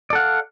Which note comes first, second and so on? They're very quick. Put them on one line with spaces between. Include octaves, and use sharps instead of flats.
D5 A4 F#5 F5